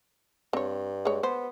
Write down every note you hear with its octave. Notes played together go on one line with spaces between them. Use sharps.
G2 C4 C#5
G#3 C#5
B3 C5